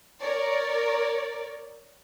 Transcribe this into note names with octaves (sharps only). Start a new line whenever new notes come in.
A#4 C#5 D5